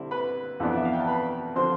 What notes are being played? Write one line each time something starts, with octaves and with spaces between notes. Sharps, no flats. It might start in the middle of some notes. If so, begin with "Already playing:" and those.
Already playing: D3 G3 C4 E4
B4 B5
F2 E3 B3 D4
E5
F5
G5
A5
B4 B5
D3 F3 C4 C5 C6